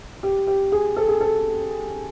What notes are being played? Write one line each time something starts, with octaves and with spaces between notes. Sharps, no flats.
G4
G4
G#4
A4
G#4
A4